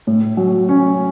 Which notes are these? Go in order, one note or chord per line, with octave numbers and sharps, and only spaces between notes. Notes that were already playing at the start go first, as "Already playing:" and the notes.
A2
F#3
C#4